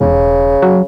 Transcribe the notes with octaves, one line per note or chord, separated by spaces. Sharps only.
E1 C#3
F#3